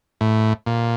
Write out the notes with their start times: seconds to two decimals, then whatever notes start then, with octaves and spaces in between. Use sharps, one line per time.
0.21 A2
0.66 A#2